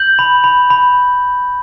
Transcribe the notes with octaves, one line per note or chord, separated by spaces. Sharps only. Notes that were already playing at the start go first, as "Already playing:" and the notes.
Already playing: G6 F#7
B5
B5
B5